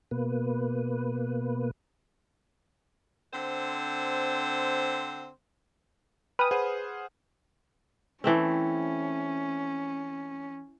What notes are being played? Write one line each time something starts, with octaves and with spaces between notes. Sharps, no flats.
B2 A#3 B4
D3 C4 C5
B4 G5 G#5 D#6 F6
G#4 C5 F#5
E3 A3 C4 C#4